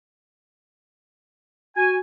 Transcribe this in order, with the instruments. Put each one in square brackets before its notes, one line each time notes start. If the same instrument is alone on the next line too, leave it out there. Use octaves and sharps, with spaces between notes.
[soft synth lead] F#4 [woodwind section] G#5